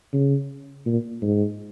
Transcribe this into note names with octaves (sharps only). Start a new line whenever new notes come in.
C#3
A#2
G#2